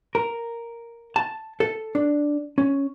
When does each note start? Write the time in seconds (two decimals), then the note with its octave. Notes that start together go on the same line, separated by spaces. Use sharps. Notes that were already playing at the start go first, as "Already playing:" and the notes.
0.15 A#4
1.16 A5
1.60 A4
1.95 D4
2.58 C#4